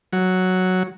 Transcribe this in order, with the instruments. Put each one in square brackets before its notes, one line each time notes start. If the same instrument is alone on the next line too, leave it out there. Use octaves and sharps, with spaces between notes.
[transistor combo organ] F#3